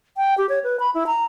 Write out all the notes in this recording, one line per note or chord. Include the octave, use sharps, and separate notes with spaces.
G5
G4
C#5
B4
B5
E4
A#5